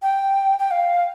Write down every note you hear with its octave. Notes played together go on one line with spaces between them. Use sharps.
G5
G5
F5